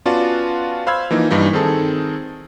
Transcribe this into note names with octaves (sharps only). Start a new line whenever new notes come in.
B3 C#4 F4 F#4 D5 A5
C5 F5 B5 E6 G#6
E3 F3 A#3 D#4
G2 E3 G3 D#4
D#3 C4 G#4 A4